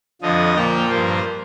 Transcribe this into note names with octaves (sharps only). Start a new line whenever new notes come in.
F2 D3 F3 D#5
A#2 F3 A#3 G5
G2 F3 A#3 C5